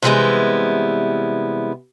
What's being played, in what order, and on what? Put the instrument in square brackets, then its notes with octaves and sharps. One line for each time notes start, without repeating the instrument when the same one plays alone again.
[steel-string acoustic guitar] C3 E3 G3 G#3 B3 E4